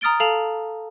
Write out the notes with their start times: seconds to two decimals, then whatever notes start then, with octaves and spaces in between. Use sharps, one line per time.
0.01 A#5 D#6 F6 A6 D7 G7
0.20 A4 F5 A5 F7